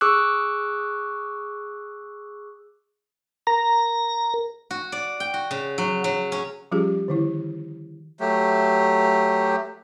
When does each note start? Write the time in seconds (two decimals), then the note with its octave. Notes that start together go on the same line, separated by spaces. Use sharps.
0.01 G#4 C#6 D6 E6 F#6
3.47 A#4 A#5
4.71 F#4
4.92 D5
5.20 G5
5.34 F#4
5.51 C#3
5.78 F#3
6.04 F#3
6.32 C#4
6.72 F3 G3 C#4 F4 G4 G#4
7.08 D3 D#3 E4
8.20 F#3 A3 G4